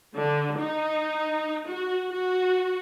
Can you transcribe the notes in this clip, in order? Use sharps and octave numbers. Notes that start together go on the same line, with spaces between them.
D3
D#4
F#4
F#4